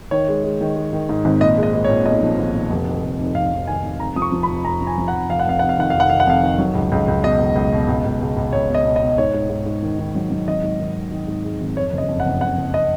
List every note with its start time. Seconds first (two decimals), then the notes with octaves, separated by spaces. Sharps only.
0.11 D#3 C#5
0.28 G#3
0.44 G#3
0.61 D#3
0.76 G#3
0.93 D#3
1.09 G#2
1.25 G#1
1.41 A#2 D#5
1.58 G#3
1.63 D#5
1.74 G#3
1.84 C#5
1.89 A#2
2.05 B1 D#5
2.23 F3
2.38 B1
2.54 A#2
2.70 F1
2.87 D#3
3.03 F1
3.19 F1
3.35 F1 F5
3.51 F1
3.68 D#3 G#5
3.85 F1
4.00 F1 A#5
4.16 F3 D#6
4.22 C#6
4.32 F3
4.43 B5
4.49 F1
4.65 F2 A#5
4.81 F3
4.87 G#5
4.98 F3
5.08 F#5
5.13 F1
5.29 F1 F5
5.39 F#5
5.45 F1 F5
5.59 F1 F#5
5.69 F5
5.78 D#3 F#5
5.90 F1 F5
6.00 F#5
6.10 D#3 F5
6.20 F#5
6.27 F2 F5
6.43 D#3
6.58 F#3
6.75 C#2
6.92 C#2
7.08 C#2
7.24 B2 D#5
7.40 C#2
7.56 C#2
7.72 B2
7.89 C#2
8.05 C#2
8.21 C#2
8.37 C#2
8.53 C#2 C#5
8.69 B2
8.75 D#5
8.85 B2
8.96 D#5
9.01 B2
9.18 G#2 C#5
9.34 G#2
9.50 G#2
9.66 G#2
9.82 D#3
9.99 D#3
10.15 F#3
10.30 F#3
10.47 G#1 D#5
10.63 G#2
10.80 D#3
10.96 D#3
11.12 D#3
11.28 G#2
11.44 G#3
11.61 G#1
11.77 F2 C#5
11.93 F#1
11.98 D#5
12.09 F2
12.20 F#5
12.25 F#1
12.41 F#1 F#5
12.58 F#1
12.74 D#5